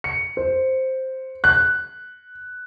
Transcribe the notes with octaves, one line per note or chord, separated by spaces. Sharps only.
C#7
C5
F#6